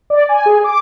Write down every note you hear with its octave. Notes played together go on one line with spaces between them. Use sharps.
D5
G#5
G#4
D6